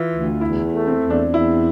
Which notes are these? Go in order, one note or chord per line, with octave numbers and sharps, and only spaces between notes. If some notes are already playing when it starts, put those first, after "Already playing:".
Already playing: E3 E4 F4
D2
E2 E4
A3
C4
E2
D4
E2 E4